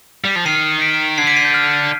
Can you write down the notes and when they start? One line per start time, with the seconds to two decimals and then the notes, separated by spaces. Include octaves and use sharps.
0.24 G3
0.36 F3
0.45 D#3 C7 D#7
0.82 B6 D7
1.18 D3 G#6 C7
1.27 B6 D7
1.36 C7 D#7
1.45 G6
1.54 F6